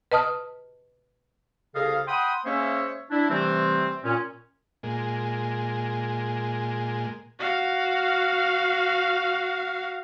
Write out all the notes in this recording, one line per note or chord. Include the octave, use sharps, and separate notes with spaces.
B4 D#5 A5 D#6 F6
C2 C#3 G#4 A4 D#5 F5
F#5 G5 B5 C6 D#6
G#3 A#3 C#4 C5 C#5 E5
D4 E4
C3 E3 G3 A3 C4
A#2 C#4
A#2 G#3
F#4 F5